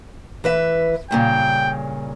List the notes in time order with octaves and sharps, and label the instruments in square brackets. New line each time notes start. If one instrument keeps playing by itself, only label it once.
[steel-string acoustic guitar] E3 B4 E5
[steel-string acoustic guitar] G2 A#2 C#3 [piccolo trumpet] G5